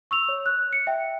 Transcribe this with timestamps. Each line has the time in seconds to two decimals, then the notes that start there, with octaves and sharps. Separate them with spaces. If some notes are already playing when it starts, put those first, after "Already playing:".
0.11 C#6 E6 F7
0.29 C#5
0.46 F#6
0.73 C#7
0.87 E5 G5